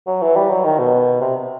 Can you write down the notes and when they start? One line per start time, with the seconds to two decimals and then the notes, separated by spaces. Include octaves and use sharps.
0.07 F#3
0.22 E3
0.36 G3
0.50 F#3
0.65 D#3
0.79 B2
1.21 C3